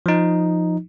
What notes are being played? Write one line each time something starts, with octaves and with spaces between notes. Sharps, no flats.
F3 D#4